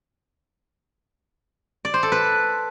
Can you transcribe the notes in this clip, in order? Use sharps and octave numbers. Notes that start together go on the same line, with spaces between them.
D5
C5
A4
B4